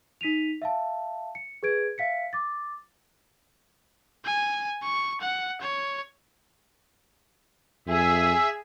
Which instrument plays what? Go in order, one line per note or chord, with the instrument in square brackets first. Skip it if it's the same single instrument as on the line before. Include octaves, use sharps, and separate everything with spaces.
[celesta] D#4 B6 D#7 F7
E5 F5 A5
C#7
G#4 B4 G#6 D7
E5 F5 B6 C#7
D6 A6
[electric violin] G#5
C#6
F#5
C#5
[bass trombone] F2 [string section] G#4 [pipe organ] E5